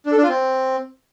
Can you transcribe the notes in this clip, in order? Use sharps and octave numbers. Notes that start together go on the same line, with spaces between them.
D4
A4
D4
F4
C4